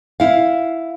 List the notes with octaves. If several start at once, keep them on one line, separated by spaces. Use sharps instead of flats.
E4 F5